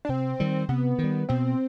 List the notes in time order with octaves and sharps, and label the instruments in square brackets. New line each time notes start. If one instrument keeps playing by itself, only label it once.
[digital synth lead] D4
[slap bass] C3 [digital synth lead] C4
[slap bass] D#3 G3
[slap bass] C3 [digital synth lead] B3
[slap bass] D#3
G3
[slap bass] B2 [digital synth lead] C4